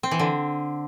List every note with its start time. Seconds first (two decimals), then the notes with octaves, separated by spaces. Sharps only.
0.03 C4
0.11 E3
0.19 D3